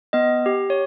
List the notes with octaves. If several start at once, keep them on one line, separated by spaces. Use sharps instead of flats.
B3 D#5
G4
C#5